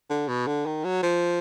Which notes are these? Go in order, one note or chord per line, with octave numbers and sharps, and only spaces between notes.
D3
B2
D3
D#3
F#3
F3